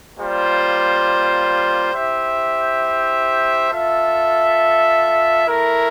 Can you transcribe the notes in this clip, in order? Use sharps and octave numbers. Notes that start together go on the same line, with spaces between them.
G3 A#3 F4 C5
E4 G4 C5 E5
F4 A4 E5
A3 E4 A#4